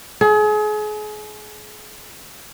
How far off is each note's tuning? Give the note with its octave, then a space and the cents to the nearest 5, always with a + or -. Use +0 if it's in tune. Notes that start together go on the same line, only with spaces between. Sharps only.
G#4 +35